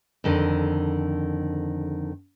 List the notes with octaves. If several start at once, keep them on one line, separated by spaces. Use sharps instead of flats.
F2 D3 D#3